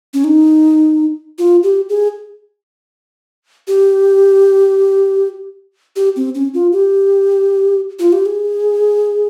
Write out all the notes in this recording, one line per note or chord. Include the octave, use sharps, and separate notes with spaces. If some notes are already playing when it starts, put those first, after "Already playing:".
C#4
D#4
F4
G4
G#4
G4
G4
C4
C#4
F4
G4
F4
G4
G#4